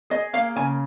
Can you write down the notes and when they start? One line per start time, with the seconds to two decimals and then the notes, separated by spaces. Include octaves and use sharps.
0.10 G#4 D#5
0.33 A#3 F5
0.56 C#3 G#5